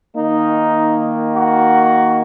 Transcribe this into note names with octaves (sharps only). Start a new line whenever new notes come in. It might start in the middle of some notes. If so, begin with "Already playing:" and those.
D#3 A#3 D#4
F#4